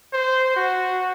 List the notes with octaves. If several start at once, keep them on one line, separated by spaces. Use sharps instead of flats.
C5
F#4